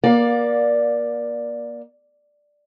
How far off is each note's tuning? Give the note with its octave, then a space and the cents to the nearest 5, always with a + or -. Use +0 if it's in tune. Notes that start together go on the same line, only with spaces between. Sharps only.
A#3 +30 D5 +0 F5 +25